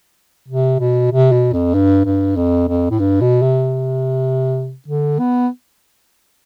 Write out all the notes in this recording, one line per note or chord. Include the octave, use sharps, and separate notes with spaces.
C3
B2
C3
B2
F2
G2
G2
F2
F2
A2
G2
B2
C3
D3
B3